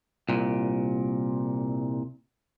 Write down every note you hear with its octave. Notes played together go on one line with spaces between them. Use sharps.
C2 A#2